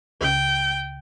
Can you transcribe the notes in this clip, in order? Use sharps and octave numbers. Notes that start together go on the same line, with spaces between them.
C#2 C#3 G5